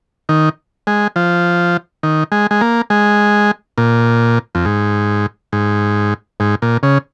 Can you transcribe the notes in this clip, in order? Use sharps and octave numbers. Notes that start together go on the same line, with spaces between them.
D#3
G#3
F3
D#3
G#3
G#3
A#3
G#3
A#2
F2
G#2
G#2
G#2
A#2
C#3